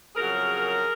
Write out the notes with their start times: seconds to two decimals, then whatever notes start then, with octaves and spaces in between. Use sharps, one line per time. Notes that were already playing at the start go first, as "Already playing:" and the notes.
0.15 F2 C#3 F#3 G#4 A#4